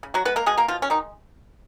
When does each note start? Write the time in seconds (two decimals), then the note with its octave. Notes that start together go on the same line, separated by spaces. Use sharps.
0.03 C#3
0.14 F#3 F#4
0.25 G#3 B3 B4
0.36 A#3 A#4
0.46 B2 G#3 G#4
0.57 A#3 A#4
0.68 B2 F3 F4
0.82 C#4
0.90 D#3 G#3 D#4